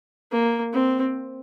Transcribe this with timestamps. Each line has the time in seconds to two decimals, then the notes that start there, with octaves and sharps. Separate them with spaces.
0.32 A#3
0.73 C4